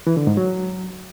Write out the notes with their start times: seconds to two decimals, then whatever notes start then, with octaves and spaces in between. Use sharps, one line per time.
0.07 E3
0.17 D3
0.27 G#2
0.37 F#3